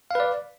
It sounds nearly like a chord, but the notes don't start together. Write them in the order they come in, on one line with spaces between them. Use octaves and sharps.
F5 B4 D5